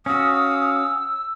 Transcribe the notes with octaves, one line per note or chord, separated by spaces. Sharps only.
C#4 F#4 F5 D#6 E6